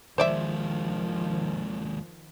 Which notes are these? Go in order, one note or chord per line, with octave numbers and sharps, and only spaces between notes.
D#2 D#3 F3 G#3 C5 D5 E5